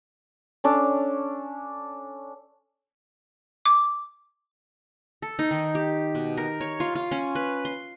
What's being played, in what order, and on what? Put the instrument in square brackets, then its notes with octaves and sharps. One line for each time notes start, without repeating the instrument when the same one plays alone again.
[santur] C#4 D4 A4
[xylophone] D6
[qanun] A4
D#4
D#3
G4
B2
A#4
C#5
F4
F4
C#4
B4
C6